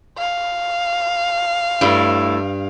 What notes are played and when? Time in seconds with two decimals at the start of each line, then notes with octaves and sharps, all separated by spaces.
0.18 F5
1.81 G2 A3 E4